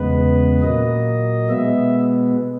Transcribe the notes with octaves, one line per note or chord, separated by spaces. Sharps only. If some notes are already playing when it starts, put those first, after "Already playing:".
Already playing: E2 C#3 G#3 B3 B4
A#2 F#3 A#3 D#5
B2 G#3 B3 E5